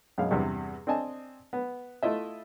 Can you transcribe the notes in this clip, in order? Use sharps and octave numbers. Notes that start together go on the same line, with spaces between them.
F#2 B2 G#3 F5
E2 G2 C3
C4 D4 D#5 G#5 A5
B3
A3 E4 F4 D#5 E5